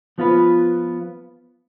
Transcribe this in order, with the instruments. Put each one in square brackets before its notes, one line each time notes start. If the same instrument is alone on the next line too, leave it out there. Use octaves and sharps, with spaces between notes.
[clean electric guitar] F3 B3 F4 B4